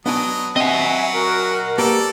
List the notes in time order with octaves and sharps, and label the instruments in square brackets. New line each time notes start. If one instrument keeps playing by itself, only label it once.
[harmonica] F#3 D#5 [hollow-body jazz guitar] B3 D4 G#5
[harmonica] F#3 [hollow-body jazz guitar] C4 [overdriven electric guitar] D#5 F#5 [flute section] E5 G#5
[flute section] F#4 A#4
[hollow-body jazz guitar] A#3 G4 B4 [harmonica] A4 D5